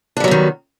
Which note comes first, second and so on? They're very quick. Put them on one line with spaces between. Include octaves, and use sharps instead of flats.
D4 G3 F#3 B3 D#3